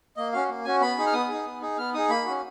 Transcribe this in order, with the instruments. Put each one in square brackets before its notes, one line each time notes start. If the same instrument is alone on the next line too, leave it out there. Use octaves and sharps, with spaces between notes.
[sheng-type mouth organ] A#3 D#5
C#4 F#4 F5
A#3
C#4 F#4 G#5
B3 B5
D#4 G#4
F6
B3 D#6
D#4 G#4
B3
D#4 G#4
B3 F6
D#4 G#4 D#6
A#3 B5
C#4 F#4